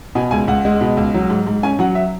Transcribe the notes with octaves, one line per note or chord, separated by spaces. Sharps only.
B2 G#5
C#2 G#5
C#2 F#5
G#3
B2
C#2
F#3
G#2
G#2
C#4 G#5
F#3 F#5
E5